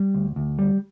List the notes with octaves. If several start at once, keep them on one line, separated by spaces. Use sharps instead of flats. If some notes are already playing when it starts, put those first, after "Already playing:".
Already playing: G3
D2
D2
G3